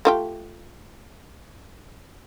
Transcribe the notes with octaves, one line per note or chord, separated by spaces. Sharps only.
A3 F4 G4